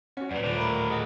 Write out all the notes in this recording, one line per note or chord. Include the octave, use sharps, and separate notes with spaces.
C#4 F#4 F#5
F#2 A#2 B4 D5
D#1 A2 D3 C5 D5 D7
A3 A#4 A#5 B5 D6
G#4 D#5 F#5